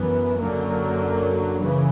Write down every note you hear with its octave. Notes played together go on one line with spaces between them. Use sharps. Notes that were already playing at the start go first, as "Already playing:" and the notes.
Already playing: F#2 E3 B3
F#2 D3 F#3 A#3
C#3 E3